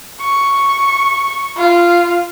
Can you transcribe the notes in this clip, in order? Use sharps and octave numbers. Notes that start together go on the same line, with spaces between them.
C#6
F4